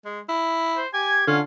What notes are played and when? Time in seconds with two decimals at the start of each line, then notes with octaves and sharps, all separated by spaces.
0.05 G#3
0.29 E4
0.77 C5
0.94 G4 G#5 G#6
1.28 D3 C#4 F4